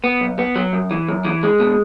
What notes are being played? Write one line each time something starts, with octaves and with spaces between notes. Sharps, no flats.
B3
B1
B3
F#3
F#2
E3
F#2
E3
G#3
B2